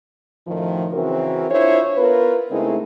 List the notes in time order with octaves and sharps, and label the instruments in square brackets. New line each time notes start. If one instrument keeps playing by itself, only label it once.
[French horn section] F#2 A2 D#3 F3
C#3 E3 C4 F#4 A#4
D4 E4 F4 C5 C#5
B3 F4 A#4 B4
C#3 G#3 A3 C4 D#4 E4